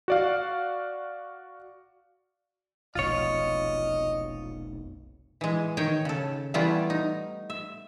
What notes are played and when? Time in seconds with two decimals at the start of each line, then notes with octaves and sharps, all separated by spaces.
0.08 F#4 D5 F5
2.95 F1 B1 F4 C#5 D#5
5.41 E3 G#3
5.77 D#3 C#5 G5
6.05 C#3 A4
6.54 E3 G3 A3 B3 E4 F4
6.90 D#4
7.50 E5